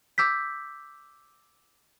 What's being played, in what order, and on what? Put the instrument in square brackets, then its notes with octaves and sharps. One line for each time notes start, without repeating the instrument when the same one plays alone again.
[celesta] D6 E6 G6 B6